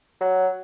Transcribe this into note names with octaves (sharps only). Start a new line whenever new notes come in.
F#3